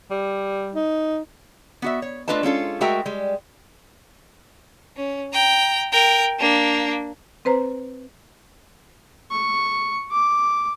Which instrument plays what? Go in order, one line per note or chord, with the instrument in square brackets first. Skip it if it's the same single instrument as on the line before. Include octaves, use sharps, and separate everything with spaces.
[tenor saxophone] G3
[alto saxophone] D#4
[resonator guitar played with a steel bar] B3 F#4 E5
C#5
A3 D4 F4 B4 D#5 A5
G#3 C#4 F4 A4
G#3 A3 F#4 A#4 E5 G5
G3 G#3
[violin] C#4
G5 A#5
A#4 G5
A#3 D4
[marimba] C4 B4 C5 A#5
[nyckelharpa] C#6
D6